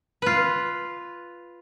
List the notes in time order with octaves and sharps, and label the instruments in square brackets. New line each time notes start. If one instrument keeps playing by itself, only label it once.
[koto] F4 B4